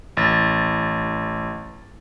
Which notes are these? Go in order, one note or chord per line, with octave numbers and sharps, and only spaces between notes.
A1 A6